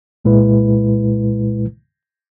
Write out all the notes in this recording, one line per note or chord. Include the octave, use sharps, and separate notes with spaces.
C2 A#2 G#3 E4 B4